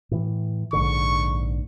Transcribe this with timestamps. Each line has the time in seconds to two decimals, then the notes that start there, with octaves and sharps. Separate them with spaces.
0.11 A2 E3
0.73 A#1 G#2 D3 C#6